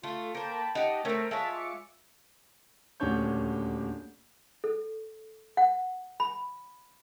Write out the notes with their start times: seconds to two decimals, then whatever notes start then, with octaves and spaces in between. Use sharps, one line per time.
0.03 A3 F4
0.35 A#3 A#4 C5 G5 A5 B5
0.75 D#4 G4 D#5 F#5 A5
1.05 A3 C4 C#4 A#4 A#6
1.31 G#3 F4 C#5 E5 A5 B6
1.53 D6 C#7
3.00 D#1 D2 C#4 D4 C#5 G6
4.64 A4
5.57 F#5
6.20 B5